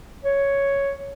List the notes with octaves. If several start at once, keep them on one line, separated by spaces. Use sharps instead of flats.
C#5